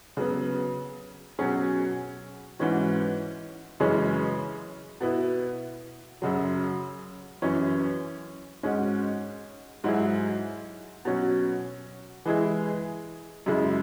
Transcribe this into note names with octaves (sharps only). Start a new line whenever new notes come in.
C#3 F#3 B3
B2 F#3 C#4 G#4
G#2 E3 C#4 F#4
F#2 C#3 E3 G#3 C#4
B2 B3 E4
F#2 C#3 F#3
F#2 E3 C#4
G#2 G#3 C#4 F#4
G#2 F#3 E4 G#4
B2 F#3 C#4
E3 G#3 E4 G#4
F#2 C#3 G#3 E4